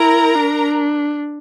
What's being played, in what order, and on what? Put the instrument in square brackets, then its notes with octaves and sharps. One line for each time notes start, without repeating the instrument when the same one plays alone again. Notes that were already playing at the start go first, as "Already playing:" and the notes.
Already playing: [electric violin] E4 [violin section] A#4 A#5
[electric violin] D4